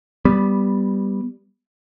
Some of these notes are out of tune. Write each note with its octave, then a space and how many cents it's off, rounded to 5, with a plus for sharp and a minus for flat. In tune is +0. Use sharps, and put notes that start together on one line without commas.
G3 +0 B3 +0